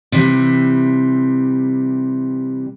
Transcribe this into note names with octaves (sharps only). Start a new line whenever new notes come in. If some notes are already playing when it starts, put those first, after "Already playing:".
C3 E3 G3